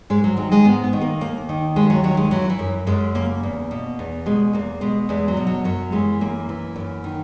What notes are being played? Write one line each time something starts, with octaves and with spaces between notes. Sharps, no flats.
G#2 G#3
F#3
D#3 F#3
G#3
G#2 B3
B3
D#3
A#3
D#2 A#3
D#3
D#2 G#3
F#3
D#3 F#3
G#3
E3 F#3
E3
F#2
F#2 G#3
C#3 A#3
E2
B2
E2
B2 G#3
E2 A#3
B2 G#3
E2 G#3
F#3
B2
F#3
F#2 F#3
E3 G#3
F#2 A#3
E3
F#2
D#3